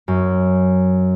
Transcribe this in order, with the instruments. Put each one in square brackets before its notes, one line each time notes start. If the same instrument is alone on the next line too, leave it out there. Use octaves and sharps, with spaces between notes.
[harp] F#2